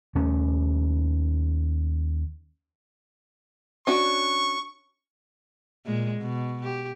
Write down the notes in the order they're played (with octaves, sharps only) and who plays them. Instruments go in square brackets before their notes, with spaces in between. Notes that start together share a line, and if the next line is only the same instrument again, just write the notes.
[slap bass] D#2 A3 C#4
[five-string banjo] C#4 D4 F#4 [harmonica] C#6
[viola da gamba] A#2 G#3
B2
G4